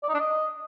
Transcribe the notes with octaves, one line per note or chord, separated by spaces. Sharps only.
D5
D#4
D4
D#5